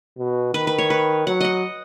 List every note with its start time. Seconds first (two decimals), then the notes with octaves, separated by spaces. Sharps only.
0.18 B2
0.54 D#3 B4
0.67 B4
0.78 C#5
0.90 B4
1.27 F#3 F#5
1.41 D#5 F#5